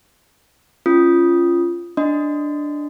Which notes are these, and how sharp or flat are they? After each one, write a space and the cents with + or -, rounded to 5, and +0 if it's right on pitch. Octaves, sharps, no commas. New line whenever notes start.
C#4 +0 F4 -15 D#6 +0
D4 +0 D#5 +0 C6 -30